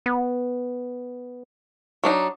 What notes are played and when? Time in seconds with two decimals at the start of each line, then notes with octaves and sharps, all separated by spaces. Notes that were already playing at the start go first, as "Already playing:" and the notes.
0.06 B3
2.04 F#3 D4 D#4